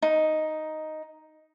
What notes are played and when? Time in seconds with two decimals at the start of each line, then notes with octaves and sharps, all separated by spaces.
0.02 D#4